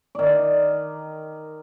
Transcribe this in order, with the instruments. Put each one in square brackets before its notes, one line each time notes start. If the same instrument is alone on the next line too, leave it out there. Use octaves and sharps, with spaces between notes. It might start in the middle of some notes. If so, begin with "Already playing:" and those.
[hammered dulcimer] D#3 D5